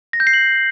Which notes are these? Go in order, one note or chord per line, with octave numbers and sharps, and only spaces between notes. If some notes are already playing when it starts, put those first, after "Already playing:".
A#6
G6
C7
F#7